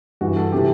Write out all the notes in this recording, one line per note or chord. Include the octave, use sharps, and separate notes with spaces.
G2 E3 F#4
A4
C3 E3 G4